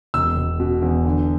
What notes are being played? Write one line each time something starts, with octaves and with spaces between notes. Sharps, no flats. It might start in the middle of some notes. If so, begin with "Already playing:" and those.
E1 E6
E1
B2
E2
D3